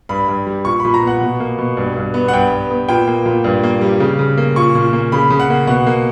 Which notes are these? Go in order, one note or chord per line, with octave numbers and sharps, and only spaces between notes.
G2 B5
G2
G3
A#2 C#6
A#2 B5
A#5
B3
F#5
B2
A#3
B2
G2
G2
B3
F#5
G2 G5
G2
B3
A#2 G5
A#3
A#2
G2
A#3
G3
C#3
C#3
A#3
A#2 C#6
A#2
A#3
C#3 B5
C#3
F#5
A#3
B2 F#5
A#3